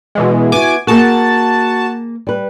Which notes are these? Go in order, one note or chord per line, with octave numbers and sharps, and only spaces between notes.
B2 E3 G#3
B3 E4 F#4 G#5 D6
A#3 F#4 G#4 A#4 A5
G3 B4